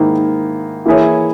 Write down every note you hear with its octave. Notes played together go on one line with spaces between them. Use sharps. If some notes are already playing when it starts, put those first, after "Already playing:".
Already playing: G#2 D#3 A#3 E4
E3 A#3 E4 G#4 C#5